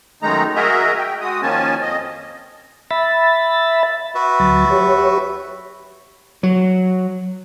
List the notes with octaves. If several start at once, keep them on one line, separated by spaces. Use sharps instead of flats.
F#2 D#3 G#3 A3 D#4 A#5
F#4 G#4 A#4 D#5 E5 A#5
G5
G#3 F#4 D#6
D#3 F3 A#3 C#4 G#5 A5
F2 D#5
E5 B5 A6
F#4 B4 E5
D2 F#3 A6
G4 C#5
F#3